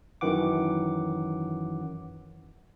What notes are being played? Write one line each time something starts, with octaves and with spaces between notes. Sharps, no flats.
F#2 D#3 E3 F#5 D6